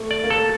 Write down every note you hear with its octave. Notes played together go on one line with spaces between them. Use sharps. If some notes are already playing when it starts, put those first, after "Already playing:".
Already playing: A3
D5
A#3
A4